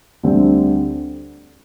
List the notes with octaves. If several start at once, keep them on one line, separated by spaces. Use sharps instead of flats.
D2 D3 G3 C4